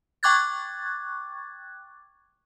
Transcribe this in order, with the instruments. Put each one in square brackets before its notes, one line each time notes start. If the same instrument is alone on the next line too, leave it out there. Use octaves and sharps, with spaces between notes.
[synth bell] G5 C#6 D6 F#6 G#6 A6